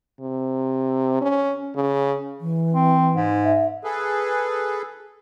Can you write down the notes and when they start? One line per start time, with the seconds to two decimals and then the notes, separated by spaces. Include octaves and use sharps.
0.21 C3
1.21 C#4
1.76 C#3
2.41 E3
2.73 C4
3.15 G#2
3.44 E5
3.84 G#4 A4 B4